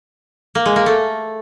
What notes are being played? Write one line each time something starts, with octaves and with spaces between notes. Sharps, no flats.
A#3
G#3
A#3
A3